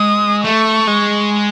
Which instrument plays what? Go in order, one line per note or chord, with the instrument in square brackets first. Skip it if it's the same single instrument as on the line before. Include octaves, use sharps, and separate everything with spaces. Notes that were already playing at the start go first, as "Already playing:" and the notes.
Already playing: [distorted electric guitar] G#3 [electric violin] D#6
[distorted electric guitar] A3 [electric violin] C#6
[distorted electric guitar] G#3